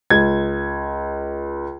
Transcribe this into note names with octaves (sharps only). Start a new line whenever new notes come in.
C#2 G#6